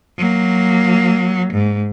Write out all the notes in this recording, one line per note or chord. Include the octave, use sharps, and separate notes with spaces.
F#3 A#3
G#2